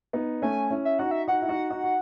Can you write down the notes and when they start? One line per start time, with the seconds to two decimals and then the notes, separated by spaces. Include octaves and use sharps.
0.13 B3 D#4
0.42 A3 C#4 G#5
0.71 C#4 E4
0.85 E5
0.99 D#4 F#4 F#5
1.11 E5
1.28 D#4 F#4 F#5
1.42 E4
1.49 D#4 F#4
1.70 D#4 F#4
1.84 F#4